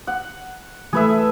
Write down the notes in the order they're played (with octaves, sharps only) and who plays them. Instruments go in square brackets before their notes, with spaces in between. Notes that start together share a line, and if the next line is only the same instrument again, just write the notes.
[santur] F#5
[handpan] E3 A3 [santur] G#4 B4 E5